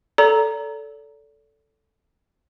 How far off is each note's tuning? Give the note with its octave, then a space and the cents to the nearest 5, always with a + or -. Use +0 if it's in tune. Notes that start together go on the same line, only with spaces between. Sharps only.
A4 +0 D5 -35 A#5 +0